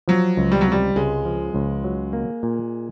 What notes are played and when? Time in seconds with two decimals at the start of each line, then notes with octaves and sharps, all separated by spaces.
0.08 F3 F#3
0.37 C#2
0.52 G3
0.61 F#3
0.67 C3 G3
0.96 C#2 G#3
1.25 F3
1.55 C#2
1.84 F#3
2.13 A#3
2.43 A#2